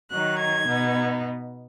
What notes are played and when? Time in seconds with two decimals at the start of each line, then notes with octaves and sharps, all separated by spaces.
0.10 D#3 F#3 D#4 F#6
0.38 G#6
0.67 B2 B3 D#4